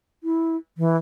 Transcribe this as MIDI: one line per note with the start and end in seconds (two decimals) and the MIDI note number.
0.24 0.56 64
0.78 0.97 52